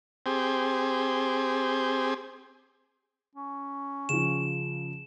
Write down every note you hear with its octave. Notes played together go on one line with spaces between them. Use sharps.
C4 G4 G#4
C#4
C#3 F3 E7